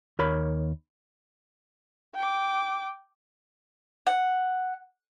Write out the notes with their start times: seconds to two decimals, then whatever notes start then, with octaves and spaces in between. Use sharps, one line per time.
0.19 D#2 A#4 C#5 B5
2.14 G5 D6
4.07 F#5